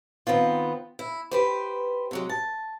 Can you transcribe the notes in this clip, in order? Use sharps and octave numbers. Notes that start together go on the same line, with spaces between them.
D#3 B3 C4 F4
E4
G4 B4 C5
C3 F#3 G#3
A5